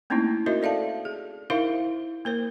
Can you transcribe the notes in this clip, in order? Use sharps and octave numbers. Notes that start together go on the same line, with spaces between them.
A3 A#3 C4 C#4 D#4 E4
D#4 F#4 A#4 C5 D#5 E5
A4 D5 E5 F5 A5
G#4
D#4 E4 A#4 C5 E5 F5
A#3 A#4 C5